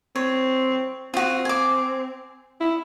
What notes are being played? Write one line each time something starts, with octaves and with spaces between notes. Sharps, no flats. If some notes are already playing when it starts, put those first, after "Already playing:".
C4 C#5
C4 F4 F#4
G#5 D6
E4